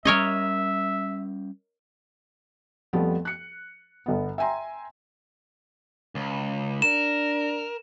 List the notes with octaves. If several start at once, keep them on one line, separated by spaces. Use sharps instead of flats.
G3 C#4 A#4 C#5 D#5 E5
F2 F3 G3 A3 B3
F#6 C#7
G1 B3
E5 G5 G#5 A#5 C6
C#2
D4 A#4 E7